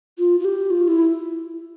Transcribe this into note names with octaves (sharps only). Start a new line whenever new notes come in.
F4
F4
G4
F4
E4